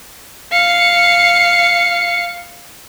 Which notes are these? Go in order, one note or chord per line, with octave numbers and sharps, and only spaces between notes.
F5 C#7